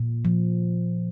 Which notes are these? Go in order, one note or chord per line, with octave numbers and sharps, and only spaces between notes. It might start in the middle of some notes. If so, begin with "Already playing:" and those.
Already playing: A#2
F3